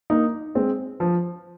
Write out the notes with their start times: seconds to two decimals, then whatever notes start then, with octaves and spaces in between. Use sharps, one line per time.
0.10 A#3 D#4
0.55 G#3 C4
1.00 F3